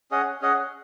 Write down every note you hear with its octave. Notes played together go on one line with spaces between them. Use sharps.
C#4 G#4 D#5 F#5
C#4 G#4 D#5 F#5